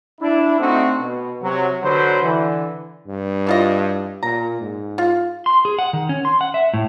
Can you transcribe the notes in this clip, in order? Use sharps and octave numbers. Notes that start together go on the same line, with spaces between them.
D4 E4
A3 C4 D4 D#4 F#4
B2
C3 F#3
D3 F#3 B4 C5
D3 E3
G2
E3 F4 D#5
A#2 A#5
G#2
F4
C6
G#4
F#5
D#3
C#4
C6
F#5
E5
A2